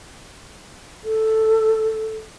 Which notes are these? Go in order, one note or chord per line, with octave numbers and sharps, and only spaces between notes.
A4